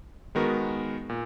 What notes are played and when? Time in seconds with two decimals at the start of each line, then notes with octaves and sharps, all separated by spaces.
0.35 D#3 G#3 B3 F#4 A#4
1.09 A#2